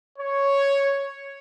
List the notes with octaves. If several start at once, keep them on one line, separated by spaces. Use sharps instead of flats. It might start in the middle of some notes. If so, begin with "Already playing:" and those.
C#5